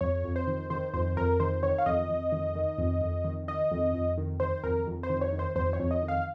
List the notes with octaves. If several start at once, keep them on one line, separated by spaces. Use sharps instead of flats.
F2 C#5
F2
C5
D#3
D#3 C5
F2 C5
F2 A#4
D#3 C5
D#3 C#5
F5
F2 D#5
F2
D#3
D#3
F2
F2
D#3
D#3 D#5
F2
F2
D#3
D#3 C5
F2 A#4
F2
C5
D#3
C#5
D#3
C5
F2 C5
C#5
F2
D#5
D#3
F5